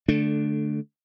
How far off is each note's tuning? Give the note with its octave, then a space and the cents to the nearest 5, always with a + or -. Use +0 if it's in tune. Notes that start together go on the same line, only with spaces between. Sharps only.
D3 +0 A3 -15 D4 +0